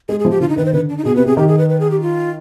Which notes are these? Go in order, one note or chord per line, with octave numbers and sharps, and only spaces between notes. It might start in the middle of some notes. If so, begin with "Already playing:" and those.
G#3 G#4
G#4
F3
G4
D3 F4
D#4
D#3 B4
C5
D3 B4
D4
D#4
B2 G#4
C3 B4
C3 G#4
D#3 G4
G#4
B4
B4
G#4
G4
F4